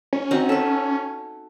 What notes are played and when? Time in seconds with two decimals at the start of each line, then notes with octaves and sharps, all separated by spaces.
0.13 C#4
0.31 C4 D#4 F#4
0.49 A4 B4